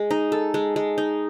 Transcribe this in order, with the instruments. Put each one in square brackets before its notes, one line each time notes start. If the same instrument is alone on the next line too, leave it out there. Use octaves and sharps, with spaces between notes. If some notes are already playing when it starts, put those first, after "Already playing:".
Already playing: [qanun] G#3
D#4
A4
G#3
G#3
D#4